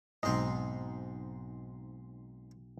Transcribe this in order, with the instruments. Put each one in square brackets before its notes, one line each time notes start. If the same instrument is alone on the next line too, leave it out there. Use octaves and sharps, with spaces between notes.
[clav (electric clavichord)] B1 D#5 [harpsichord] G#2 C4